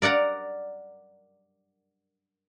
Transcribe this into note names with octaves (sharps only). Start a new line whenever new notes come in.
A#4 D5 F#5 A#5